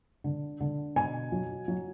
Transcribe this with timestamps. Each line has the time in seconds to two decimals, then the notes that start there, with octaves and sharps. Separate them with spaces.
0.24 D3
0.60 D3
0.96 B2 G#5
1.32 F#3
1.68 F#3